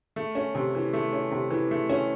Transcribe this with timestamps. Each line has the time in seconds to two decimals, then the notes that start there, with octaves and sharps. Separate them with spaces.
0.16 A3
0.35 C#4
0.55 C3
0.75 E3
0.93 A3
1.13 C#4
1.31 C3
1.51 E3
1.71 A3
1.90 C#4